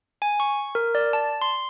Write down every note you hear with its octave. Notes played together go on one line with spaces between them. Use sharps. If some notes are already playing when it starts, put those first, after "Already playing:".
G#5
C#6
A#4
D5
A5
C6